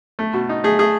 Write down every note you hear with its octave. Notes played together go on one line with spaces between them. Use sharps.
A3
B2
D#4
A3 G#4
A3 G#4